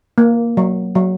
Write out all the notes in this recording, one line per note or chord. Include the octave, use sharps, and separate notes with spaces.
A#3
F#3
F#3